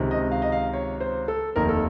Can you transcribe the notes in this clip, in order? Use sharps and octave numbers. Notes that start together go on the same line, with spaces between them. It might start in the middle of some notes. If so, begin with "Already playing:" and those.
Already playing: C#2 C3 D#3
D#5
F5
D#5
F5
C#5
C5
A4
F1 D#2 D#3 A#4
A4